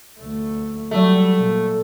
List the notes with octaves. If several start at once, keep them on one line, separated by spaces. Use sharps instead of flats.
D2 A3
F#3 G3 A3
A#2